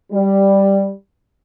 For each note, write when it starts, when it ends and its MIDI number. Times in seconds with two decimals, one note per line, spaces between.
0.12 0.90 55